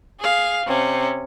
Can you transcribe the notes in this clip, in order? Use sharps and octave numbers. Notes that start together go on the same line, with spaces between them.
G#4 F5
C3 C#4